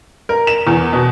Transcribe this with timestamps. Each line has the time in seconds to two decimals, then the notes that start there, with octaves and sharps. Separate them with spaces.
0.29 A#4
0.47 E7
0.67 E2
0.93 B2